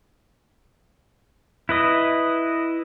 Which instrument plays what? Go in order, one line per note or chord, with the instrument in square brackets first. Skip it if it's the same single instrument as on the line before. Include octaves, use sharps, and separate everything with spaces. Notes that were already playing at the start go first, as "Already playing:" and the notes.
[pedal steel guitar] E4 B4 D#5